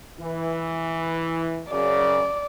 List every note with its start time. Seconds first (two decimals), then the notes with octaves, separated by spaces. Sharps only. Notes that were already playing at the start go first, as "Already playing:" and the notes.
0.19 E3
1.70 F#2 C#3 D5